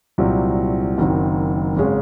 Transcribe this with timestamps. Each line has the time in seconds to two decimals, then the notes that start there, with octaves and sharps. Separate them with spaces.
0.18 C2 A#2 F#3 C4
0.98 F#1 F#2 D#3 F#3 C4
1.77 G#1 C#3 G#3 C#4